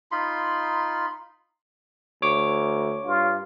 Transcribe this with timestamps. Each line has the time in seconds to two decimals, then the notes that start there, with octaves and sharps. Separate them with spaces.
0.12 D#4 F4 B5 C6
2.22 D2 C#5 D6
3.05 G2 F4